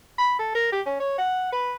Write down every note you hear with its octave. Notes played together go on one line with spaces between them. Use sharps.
B5
A4
A#4
G4
C#4
C#5
F#5
B4